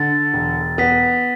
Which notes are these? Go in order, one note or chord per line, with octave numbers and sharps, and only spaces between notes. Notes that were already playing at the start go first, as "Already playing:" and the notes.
Already playing: D3 A6
E1
B3 B6